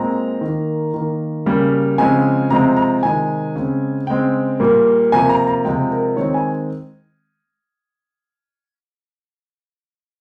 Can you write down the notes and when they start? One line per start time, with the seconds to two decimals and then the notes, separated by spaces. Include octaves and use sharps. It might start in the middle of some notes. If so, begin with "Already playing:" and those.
Already playing: A#2 G#3 C4 A#5
0.41 D#3 A#3
0.94 D#3 A#3
1.46 C#3 G3 A#3
1.98 C#3 F3 G#3 C4 G#5
2.50 C3 F3 G#3 C4 A#5
2.77 A#5
3.03 C3 D#3 G#3 G#5
3.55 C#3 G#3 C4
4.07 C#3 G#3 C4 G5
4.60 A#2 G3 A#3
5.12 C3 F3 A#3 G#5
5.29 A#5
5.47 A#5
5.65 C3 F3 G#3 G5
5.91 A#4
6.17 D#3 G#3 C4 C#5
6.34 G#5